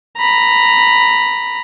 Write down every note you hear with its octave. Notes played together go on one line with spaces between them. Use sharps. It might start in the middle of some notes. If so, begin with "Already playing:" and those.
A#5 B5